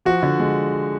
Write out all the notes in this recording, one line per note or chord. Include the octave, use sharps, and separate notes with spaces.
F3 F#4
D3
G#3